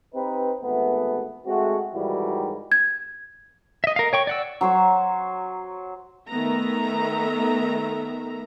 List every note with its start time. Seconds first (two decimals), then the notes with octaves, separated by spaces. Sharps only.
0.15 C4 D#4 G4 B4
0.63 G#1 E3 A3 B3
1.46 G#3 A3 C4 F#4
1.94 G#2 D#3 E3 G3 E4 F#4
2.72 G#6
3.84 D#5 E5
3.96 A#4 F5
4.13 C#5 G5 C#6
4.27 D5 F#5 E6
4.61 F#3 C5 C#5
6.28 D#3 A3 B3 E5 A#5